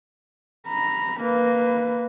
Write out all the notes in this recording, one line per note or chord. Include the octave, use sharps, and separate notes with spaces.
A#5 B5
A#3 B4